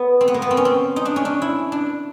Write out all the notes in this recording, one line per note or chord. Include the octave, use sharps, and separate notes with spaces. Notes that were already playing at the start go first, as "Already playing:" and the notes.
Already playing: B3
C4
B3
A#3
B3
C4
C#4
C4
D#4
D4
C#4
D4
E4
D4